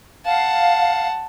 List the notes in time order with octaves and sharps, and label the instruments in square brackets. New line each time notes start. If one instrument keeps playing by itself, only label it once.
[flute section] F5 [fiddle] F#5 A5